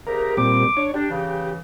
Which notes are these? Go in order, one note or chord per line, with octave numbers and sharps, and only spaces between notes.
C2 C#3 G4 A#4
A#2 G3 C4 D6
D4 C#5
D4 G4
C#3 E3